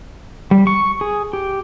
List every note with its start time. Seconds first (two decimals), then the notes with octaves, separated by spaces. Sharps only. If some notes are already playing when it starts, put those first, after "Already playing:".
0.51 G3
0.67 C#6
1.01 G#4
1.33 G4